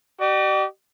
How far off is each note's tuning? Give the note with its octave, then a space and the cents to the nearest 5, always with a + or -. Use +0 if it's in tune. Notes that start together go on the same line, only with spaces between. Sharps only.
G4 -40 D5 +45